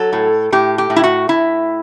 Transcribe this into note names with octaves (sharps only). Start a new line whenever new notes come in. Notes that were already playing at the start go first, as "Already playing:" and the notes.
Already playing: F#3 A4
A2
A2 G4
G4
A2
E4
F#4
A2 E4